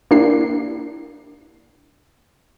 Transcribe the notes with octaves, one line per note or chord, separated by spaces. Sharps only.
A#3 D4 E4 G4 C7